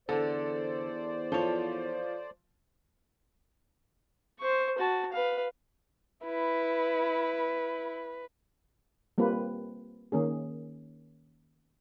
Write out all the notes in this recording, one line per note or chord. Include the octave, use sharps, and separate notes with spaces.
E2 D3 A4 C5 D5
F3 A4 C#5
C5 C#6
F#4 A5
B4 F5
E4 B4
G3 A#3 C4 F4 B4
D#3 A#3 C#4 G#4